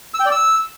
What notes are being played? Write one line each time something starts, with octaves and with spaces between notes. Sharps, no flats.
E6
G5
D5
E6